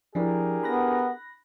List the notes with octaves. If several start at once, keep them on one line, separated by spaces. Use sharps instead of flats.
F3 D4 E4 G4 G#4 A#4
B3 B5 F#6 A#6